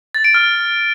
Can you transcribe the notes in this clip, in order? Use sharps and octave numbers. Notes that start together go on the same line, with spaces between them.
A6
D7
F6